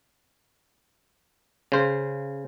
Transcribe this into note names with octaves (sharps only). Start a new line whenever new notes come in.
C#3 C5